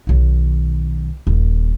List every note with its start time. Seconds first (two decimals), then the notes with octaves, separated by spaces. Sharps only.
0.07 B1 D#3
1.27 D#1